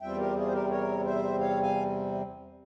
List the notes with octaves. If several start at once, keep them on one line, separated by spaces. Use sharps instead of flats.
E2 C3 G3 C4 F4 E5 G5
G4 A#4
F4 G#4
C5
G4 A#4
A#4 C#5
C5 E5
C#5 F5
F5 G#5